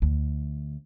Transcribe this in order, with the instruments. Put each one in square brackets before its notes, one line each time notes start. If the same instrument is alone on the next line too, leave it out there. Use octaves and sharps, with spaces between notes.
[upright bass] D2